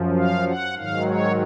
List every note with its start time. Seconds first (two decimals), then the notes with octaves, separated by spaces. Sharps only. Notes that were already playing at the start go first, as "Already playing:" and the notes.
Already playing: F#2 F3
0.18 F5
0.48 F#5
0.76 G#2 D#3 F#3 F5
1.06 C#5